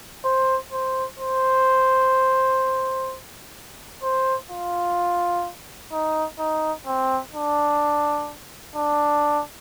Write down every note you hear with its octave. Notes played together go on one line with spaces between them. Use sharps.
C5
C5
C5
C5
F4
D#4
D#4
C4
D4
D4